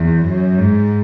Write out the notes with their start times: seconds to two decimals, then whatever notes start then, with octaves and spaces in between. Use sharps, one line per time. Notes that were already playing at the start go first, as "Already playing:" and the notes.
Already playing: E2
0.25 F#2
0.59 G#2